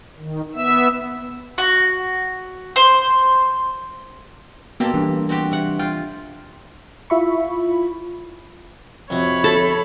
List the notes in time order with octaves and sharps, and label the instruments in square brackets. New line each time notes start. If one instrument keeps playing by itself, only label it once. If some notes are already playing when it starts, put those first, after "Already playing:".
[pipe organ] D#3
B3 E5 E6
[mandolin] F#4
C5
[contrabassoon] B2 [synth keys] A#3 A4 [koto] C4 G4
[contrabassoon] G2 [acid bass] E3
[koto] C4 F#4 G4
C3 F#5
[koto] F4 [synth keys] G5
[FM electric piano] E4 F4 E5 B5 C#6
[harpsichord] F2 C3 F#4 [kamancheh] C#5 B5
[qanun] A4